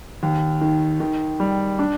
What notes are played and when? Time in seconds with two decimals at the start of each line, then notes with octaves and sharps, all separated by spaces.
0.23 D#2
0.61 D#3
1.00 D#3
1.40 G3
1.79 D4